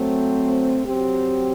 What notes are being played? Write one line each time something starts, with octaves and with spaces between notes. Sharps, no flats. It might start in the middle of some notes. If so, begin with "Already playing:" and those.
Already playing: F#3 A3 C4
F#3 C4 G4